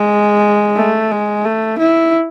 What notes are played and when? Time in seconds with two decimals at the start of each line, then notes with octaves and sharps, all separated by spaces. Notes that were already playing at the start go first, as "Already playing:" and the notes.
Already playing: G#3
0.77 A3
1.11 G#3
1.45 A3
1.79 E4